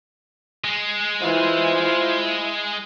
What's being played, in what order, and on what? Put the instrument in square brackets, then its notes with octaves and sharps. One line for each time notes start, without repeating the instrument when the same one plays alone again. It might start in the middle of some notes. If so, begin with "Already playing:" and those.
[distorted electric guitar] G#3
[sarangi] E3 [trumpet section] F4 C5
[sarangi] E4